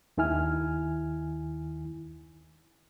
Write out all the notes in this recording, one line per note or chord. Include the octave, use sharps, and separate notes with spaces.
D#2 D#3 E4 G#5 F6